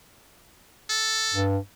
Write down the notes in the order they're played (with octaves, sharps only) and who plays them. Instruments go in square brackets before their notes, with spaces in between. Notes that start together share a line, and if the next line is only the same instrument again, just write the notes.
[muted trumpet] A4
[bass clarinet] G2